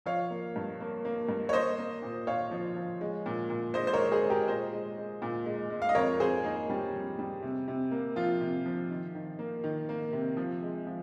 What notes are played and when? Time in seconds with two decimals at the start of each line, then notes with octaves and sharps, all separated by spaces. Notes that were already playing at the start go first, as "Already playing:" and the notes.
0.06 F3 C#5 F5
0.30 A#3
0.56 G2
0.80 A#3
1.05 A#3
1.29 G2
1.49 C#5
1.53 A#3 C5 D#5
1.78 A#3
2.02 A#2
2.27 A#2 C#5 F5
2.51 F3
2.76 F3
3.01 G#3
3.26 A#2
3.50 A#2
3.74 G#3 C5 D#5
3.87 C5
3.93 G#3 A#4 C#5
4.11 G#4 C5
4.23 G#3
4.30 G4 A#4
4.48 A#2 C5 D#5
4.73 G#3
4.97 G#3
5.22 A#2
5.46 G#3
5.70 G#3
5.82 F5
5.89 D#5
5.95 F2 A#4 C#5
6.20 F2 G#4 C5
6.44 A#3 D#4
6.70 G3
6.93 F2
7.19 G3
7.42 C3
7.68 C3
7.91 A#3
8.16 F3 F4
8.41 C3
8.66 F3
8.90 D#3
9.15 D#3
9.39 A#3
9.64 D#3
9.89 A#3
10.12 C3
10.37 F3
10.62 G#3
10.87 F3